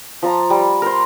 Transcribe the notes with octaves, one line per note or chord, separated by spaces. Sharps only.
F3 A5 A#5
G3
A#4 C5